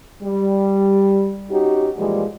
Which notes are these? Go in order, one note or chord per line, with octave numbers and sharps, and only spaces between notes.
G3
C#4 D#4 F#4 G4
A#2 E3 F3 G3 G#3